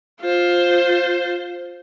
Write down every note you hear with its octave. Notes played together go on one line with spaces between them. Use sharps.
F4 C5